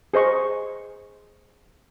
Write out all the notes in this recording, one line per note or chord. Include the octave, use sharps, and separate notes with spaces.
G#4 C5 D#5 C#6